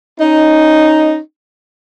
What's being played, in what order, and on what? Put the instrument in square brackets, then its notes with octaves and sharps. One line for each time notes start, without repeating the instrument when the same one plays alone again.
[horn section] C#4 D#4